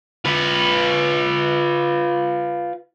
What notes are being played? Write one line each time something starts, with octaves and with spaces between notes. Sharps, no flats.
F4 B4